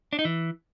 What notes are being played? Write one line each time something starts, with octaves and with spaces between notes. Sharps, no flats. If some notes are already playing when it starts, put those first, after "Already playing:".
D4
D#4
E3